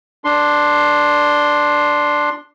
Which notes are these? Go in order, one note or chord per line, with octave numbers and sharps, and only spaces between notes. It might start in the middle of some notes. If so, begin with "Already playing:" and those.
D4 C6